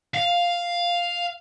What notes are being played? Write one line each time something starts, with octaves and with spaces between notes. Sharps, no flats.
F5